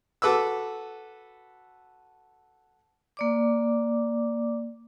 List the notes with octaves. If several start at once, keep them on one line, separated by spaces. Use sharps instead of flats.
F#4 A4 B4 D6 E6
A#3 D5 D6